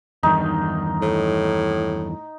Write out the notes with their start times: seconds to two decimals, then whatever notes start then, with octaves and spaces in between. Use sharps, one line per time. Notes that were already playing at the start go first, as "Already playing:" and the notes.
0.23 E2 G2 D#3 D#4
1.02 A2